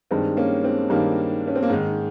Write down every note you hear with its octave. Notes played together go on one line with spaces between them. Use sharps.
G2 D#3 G#3 C4
A#3 C#4
G#3 C4
G2 D#3 G3 A#3
C#4
C4
A#3
G#2 D#3 G#3